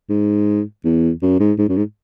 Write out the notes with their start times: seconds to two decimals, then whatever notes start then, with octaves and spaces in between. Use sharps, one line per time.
0.09 G#2
0.85 E2
1.22 F#2
1.40 G#2
1.58 G#2
1.69 F#2
1.77 G#2